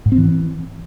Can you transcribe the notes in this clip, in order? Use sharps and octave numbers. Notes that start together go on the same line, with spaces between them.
G#2
C4
E3